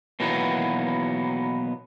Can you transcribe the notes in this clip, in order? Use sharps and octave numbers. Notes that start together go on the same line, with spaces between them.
B2 D#3 E3 F#3 A#3 B3